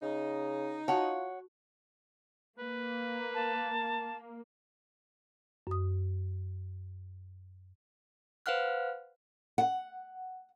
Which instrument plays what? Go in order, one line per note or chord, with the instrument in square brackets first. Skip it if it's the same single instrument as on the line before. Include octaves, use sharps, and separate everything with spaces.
[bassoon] C#3 [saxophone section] D#4
[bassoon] F4 [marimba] F#4 A5 [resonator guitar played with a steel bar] C#5 F#5
[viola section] A#3 [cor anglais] B4
[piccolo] A5
[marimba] F#2 D#6
[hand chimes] B4 C5 F5 F#5 F6 F#6
[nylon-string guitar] F#5